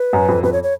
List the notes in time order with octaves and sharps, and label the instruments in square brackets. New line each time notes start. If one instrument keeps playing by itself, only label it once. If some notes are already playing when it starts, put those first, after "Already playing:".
Already playing: [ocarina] B4
[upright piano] F#2
F2
[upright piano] F2 [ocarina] B4
[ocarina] C#5
C#5